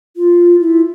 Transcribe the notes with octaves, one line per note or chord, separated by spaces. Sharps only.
F4
E4